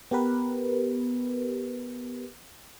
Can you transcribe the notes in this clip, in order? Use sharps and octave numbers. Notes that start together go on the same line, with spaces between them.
B3 G4 A#4 B4